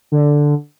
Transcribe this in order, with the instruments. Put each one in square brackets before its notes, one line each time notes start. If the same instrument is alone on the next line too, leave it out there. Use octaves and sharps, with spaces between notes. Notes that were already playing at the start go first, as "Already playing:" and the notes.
[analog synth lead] D3